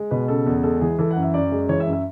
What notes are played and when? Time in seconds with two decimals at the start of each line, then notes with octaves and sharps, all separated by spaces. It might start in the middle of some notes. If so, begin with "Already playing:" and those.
Already playing: G#3
0.11 B2 B4
0.28 C#3 A4
0.46 E2
0.63 G#3 A4
0.81 E3 G#4
0.98 E3 A4
1.11 F#5
1.16 F#2
1.22 E5
1.34 F#2 D5
1.52 G#3
1.69 E3 C#5
1.80 E5
1.87 F#2
1.92 E5